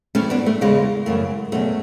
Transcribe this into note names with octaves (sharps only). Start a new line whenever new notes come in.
A2 E3 A3 C#4
B3 D4
A3
E2 C#3 E3 G#3
F#2 C#3 E3 A3
E2 B2 F#3 A3 C#4